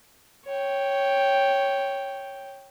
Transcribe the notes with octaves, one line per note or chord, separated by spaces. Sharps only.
C#5 G5